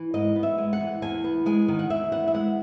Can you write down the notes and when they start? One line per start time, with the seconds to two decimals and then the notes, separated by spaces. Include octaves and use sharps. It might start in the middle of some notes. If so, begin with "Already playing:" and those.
Already playing: E3
0.14 G#2 D#5
0.36 B3
0.43 E5
0.58 G#3
0.73 F#5
0.80 E3
1.02 E2 G#5
1.24 B3
1.46 G#3 G#5
1.68 D#3
1.79 F#5
1.90 E2 E5
2.12 B3 F#5
2.28 E5
2.34 G#3 F#5